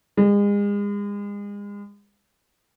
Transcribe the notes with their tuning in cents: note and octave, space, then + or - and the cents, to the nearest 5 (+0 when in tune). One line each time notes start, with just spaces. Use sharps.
G#3 -35